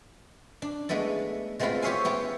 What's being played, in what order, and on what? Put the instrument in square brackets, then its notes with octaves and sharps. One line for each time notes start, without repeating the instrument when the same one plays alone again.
[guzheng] D4
G#3 A3 B3 E4 A4
G#3 A3 B3 C4 E4 F4
G4 C5 C#5 E5 F5 G#5
B3 E4 G4